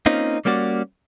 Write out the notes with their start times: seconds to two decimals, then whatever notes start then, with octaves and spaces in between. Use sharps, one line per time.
0.06 A#3 C4 C#4 D#4 F4
0.45 G3 A#3 C#4 F#4 D5